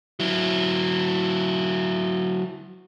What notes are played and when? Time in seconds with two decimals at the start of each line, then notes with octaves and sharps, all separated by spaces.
0.20 F#3 E4